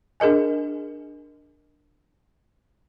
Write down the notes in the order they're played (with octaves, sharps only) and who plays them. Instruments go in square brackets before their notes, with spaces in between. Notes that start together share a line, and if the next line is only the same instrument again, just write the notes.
[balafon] D4 G#4 A#4 D#5 G#5